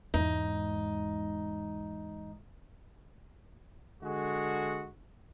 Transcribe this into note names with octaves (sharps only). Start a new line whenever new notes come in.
E2 G#2 D#4
D3 G#3 F#4